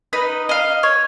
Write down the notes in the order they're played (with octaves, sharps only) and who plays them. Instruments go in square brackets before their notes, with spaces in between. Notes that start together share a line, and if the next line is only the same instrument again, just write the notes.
[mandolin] D#4 B4 B5
D#5 F5
C#5